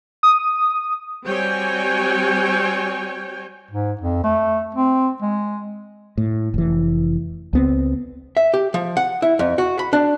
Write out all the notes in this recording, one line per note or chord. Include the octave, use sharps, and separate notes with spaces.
D#6
G3 C4 F#4 C#5 G5 G#5
G#2
F2
A3
C4
G#3
A2
F1 E3
C#2 B3 C4
E5
G4
F3
F#5
E4
F2
F#4
B5
D4